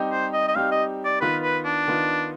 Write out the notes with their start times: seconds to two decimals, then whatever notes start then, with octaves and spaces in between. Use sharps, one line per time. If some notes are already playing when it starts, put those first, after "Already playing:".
Already playing: G3 C4 D#4 G4
0.11 C5
0.33 D#5
0.48 D#5
0.55 G3 C4 D#4 G4 F5
0.72 D#5
1.05 D5
1.21 D#3 B3 F4 B4
1.43 B4
1.65 D4
1.88 D#3 B3 F4